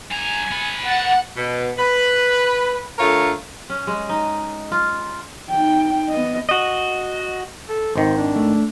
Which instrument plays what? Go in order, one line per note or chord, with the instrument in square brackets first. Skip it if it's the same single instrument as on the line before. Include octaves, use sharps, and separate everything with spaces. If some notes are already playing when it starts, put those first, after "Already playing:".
[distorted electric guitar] G2 A#5 [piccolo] G#5
[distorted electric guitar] A#3 B5
[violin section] F#5 [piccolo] A6
[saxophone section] B2
B4
D3 A3 F4 A#4 C#5
[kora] C#4
G#3
D#4
F4
[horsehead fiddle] D#4 G5
B3 D#5
[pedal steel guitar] F#4 D#5
[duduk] A4
[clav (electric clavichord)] G#1 D#3 [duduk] C5
[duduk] D4
[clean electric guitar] A3